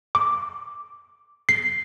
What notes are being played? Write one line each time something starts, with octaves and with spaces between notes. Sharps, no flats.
D6
C7